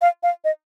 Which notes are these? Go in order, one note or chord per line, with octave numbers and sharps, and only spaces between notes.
F5
F5
D#5